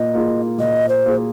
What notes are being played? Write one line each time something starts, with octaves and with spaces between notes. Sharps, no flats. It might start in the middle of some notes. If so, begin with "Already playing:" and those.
Already playing: A#2 A#3 D#5
A#3 F4 G#4
A#2 D#5
C5
A#3 F4 G#4